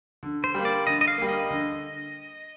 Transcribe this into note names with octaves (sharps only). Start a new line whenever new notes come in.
D3
C5
G3 A#3
D5
D3 D#5
D#5
F5
G3 A#3
D#5
D3